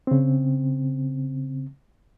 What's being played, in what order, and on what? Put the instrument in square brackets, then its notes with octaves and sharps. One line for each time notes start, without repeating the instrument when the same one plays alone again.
[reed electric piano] C#3 C4